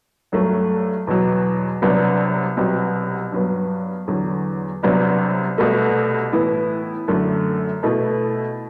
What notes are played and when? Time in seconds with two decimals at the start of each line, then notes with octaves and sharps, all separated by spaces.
0.32 G2 F#3 A3
1.07 E2 B2 F#3
1.82 C2 C3 F#3 B3 D4
2.57 C2 B2 F#3 C4
3.32 G2 F#3 B3
4.07 E2 D3 F#3
4.83 C2 C3 F#3 B3 D4
5.58 C2 B2 A3
6.33 A2 E3 B3 E4
7.08 F#2 D3 A3
7.83 B2 A3 E4